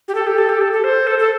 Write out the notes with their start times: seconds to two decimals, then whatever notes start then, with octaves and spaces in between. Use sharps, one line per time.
0.08 G4
0.15 A4
0.27 G4
0.38 A4
0.49 G4
0.61 A4
0.73 A4
0.84 C5
1.07 A4
1.19 A4